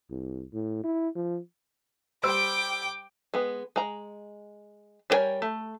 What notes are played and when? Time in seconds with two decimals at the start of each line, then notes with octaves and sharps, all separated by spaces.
0.10 C2
0.53 A2
0.84 E4
1.15 F3
2.23 G3 C5 G5 D6 E6
3.34 G#3 B3
3.76 G#3 A#5
5.10 G3 D4 A#4 C#5 G#5
5.42 A3